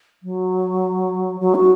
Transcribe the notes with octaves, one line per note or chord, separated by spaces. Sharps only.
F#3
F#3
F#4